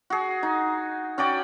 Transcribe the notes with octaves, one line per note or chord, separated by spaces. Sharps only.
F#4 G#4
D#4
C#4 F#4 D5 G5